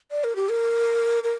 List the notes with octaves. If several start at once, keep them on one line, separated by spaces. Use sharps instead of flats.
D5
A#4
G4
A#4
A#4